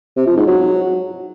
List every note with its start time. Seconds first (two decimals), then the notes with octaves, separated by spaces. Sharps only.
0.17 C3
0.27 F3
0.37 G#2
0.47 F#3